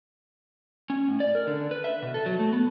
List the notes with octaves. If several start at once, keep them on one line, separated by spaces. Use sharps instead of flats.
C#4
A2
D5
A#4
D3
B4
E5
B2
A4
F#3
A3
B3